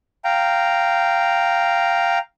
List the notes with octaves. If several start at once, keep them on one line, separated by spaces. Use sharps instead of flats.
F5 G5 A#5